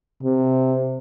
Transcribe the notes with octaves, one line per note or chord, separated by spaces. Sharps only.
C3